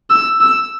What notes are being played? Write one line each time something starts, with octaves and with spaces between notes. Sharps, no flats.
E6
E6